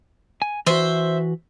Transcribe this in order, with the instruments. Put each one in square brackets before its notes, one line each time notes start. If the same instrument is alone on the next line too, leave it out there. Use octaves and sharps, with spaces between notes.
[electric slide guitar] G#5
[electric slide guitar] E3 F#4 [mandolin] C5 E5